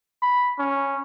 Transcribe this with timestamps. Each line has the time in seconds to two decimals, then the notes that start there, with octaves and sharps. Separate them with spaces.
0.22 B5
0.59 C#4